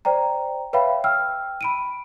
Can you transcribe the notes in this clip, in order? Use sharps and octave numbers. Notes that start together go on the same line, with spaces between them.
C5 D5 G5 A#5
B4 C#5 E5 F5 G5 B5
G5 E6 F6
B5 D7 D#7